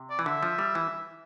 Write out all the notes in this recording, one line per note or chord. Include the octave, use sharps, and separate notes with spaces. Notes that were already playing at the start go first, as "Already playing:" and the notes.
Already playing: C3
D5
E3
D3 E5
F3
G3
E3